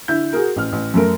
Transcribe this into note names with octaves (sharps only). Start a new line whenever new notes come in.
D3 E4 G6
F#4 G#4 A#4
A1 F6
A1
F#2 A3 A#4